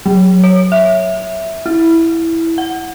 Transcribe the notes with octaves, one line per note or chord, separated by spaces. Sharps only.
F#3
C#5
E5
E4
F#5